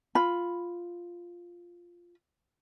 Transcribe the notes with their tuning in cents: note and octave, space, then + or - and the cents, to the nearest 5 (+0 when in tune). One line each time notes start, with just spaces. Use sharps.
F4 +0 B5 +0